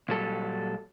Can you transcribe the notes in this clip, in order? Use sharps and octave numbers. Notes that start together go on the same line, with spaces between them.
A#2 F#3 G3 A4